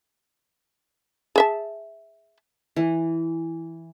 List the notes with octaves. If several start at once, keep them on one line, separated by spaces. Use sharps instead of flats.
G#4 E5 A5
E3